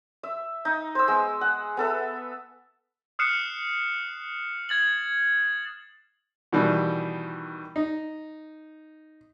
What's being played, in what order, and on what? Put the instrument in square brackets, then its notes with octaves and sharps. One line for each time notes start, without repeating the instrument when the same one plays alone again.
[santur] E5
D#4
C5 E6
G#3 B3
F#5
B3 A4 E5
[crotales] D#6 F6 F#6 C7 C#7 E7
G#6 A6 F#7
[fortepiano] B2 D#3 E3 G3
D#4